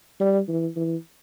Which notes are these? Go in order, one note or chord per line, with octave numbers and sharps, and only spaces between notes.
G3
E3
E3